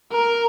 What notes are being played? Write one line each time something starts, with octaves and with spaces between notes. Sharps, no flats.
A#4